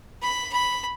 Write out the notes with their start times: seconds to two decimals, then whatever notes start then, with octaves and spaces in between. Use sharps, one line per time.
0.22 B5
0.53 B5